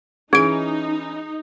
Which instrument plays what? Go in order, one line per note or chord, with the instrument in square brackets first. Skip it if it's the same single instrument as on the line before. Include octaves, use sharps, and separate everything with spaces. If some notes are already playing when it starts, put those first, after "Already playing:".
[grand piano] E3 C#4 [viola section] D#4 [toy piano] G#4 [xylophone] G#6 D7